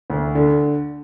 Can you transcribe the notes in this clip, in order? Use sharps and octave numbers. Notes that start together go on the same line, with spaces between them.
D2
D3